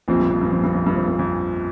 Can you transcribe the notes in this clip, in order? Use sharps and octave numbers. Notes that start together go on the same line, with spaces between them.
A#1 F2 A#2 F3 C4
G2
F2
G2
F2
G2
F2
G2
F2
G2
F2